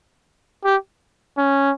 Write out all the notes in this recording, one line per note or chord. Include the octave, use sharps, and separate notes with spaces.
G4
C#4